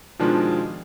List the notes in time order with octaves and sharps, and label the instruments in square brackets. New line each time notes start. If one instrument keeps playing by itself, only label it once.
[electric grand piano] B2 D#3 F3 G#3 D4 F4